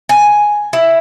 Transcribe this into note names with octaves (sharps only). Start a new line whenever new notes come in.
G#5
E4